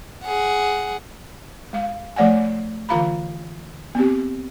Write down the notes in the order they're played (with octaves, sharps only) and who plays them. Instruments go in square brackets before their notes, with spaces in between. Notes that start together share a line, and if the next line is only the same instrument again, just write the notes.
[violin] G#4 F#5
[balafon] G#3 F5
F3 A3 D5 F#5 G#5
D3 E3 F4 F5 A#5 B5
B3 C4 G4